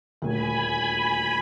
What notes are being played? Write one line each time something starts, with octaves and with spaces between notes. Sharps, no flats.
D#1 D2 G#5 B5